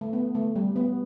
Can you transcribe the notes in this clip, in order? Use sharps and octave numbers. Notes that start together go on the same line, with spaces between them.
A3
B3
A3
G3
B3